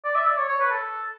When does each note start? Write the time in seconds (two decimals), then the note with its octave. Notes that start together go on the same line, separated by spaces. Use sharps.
0.04 D5
0.15 E5
0.27 D5
0.37 C#5
0.48 C#5
0.60 B4
0.71 A4